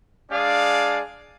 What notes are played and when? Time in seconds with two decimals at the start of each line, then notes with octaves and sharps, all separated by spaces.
0.30 G#3 D4 G#4 D5 F5